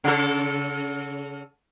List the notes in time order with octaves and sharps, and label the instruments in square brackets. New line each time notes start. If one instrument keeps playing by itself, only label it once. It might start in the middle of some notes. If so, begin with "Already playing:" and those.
[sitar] C#3 A4